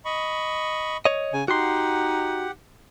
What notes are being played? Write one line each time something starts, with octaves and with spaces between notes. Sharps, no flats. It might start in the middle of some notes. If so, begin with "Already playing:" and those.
D#5 B5 C#6
C#5 D#5
C#3 G#5
D#4 F#4 G4 F#5 C6